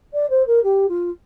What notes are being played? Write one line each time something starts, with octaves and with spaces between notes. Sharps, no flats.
D5
C5
A#4
G4
F4